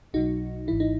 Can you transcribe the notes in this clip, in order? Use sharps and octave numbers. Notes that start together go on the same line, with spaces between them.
B1 B2 F#3 D#4 F#4
G#1 G#2 E3 E4
D#4